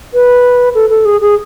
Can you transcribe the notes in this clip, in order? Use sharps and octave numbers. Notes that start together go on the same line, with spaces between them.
B4
A4
A4
G#4
G#4